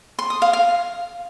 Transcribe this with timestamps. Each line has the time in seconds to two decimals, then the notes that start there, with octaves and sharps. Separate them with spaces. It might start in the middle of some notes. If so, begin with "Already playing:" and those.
0.19 C6
0.30 D#6
0.42 F5
0.53 F5